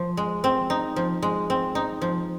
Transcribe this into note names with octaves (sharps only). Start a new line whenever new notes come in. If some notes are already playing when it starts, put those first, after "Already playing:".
Already playing: F3
G#3
C4
D#4
F3
G#3
C4
D#4
F3